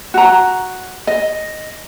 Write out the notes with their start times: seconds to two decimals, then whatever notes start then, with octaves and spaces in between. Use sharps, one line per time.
0.14 F#4 A#5
1.07 D#5